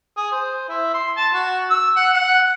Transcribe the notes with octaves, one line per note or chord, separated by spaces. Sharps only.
G#4
C5
E4
C6
A5
F#4
E6
F#5
F#5